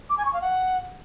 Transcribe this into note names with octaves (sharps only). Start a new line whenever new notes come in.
D6
G#5
C#6
F5
F#5